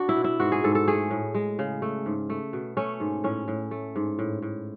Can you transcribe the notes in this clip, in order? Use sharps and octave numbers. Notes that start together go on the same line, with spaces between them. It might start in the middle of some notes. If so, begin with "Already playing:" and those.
Already playing: D4 F#4
E4
B2
E4
G#2 F#4
G#4
G#2 A4
A4
A3 G#4
A2
G#3
C#3
A3
G#2
A3
B2
A3 C#4
G#2
A2 C#4
A2
A3
G#2
A2
A2